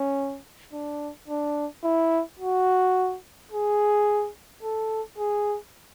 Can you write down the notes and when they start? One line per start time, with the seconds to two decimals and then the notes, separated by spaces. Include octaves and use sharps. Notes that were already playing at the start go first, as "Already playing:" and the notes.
Already playing: C#4
0.73 D4
1.28 D4
1.84 E4
2.39 F#4
3.52 G#4
4.63 A4
5.18 G#4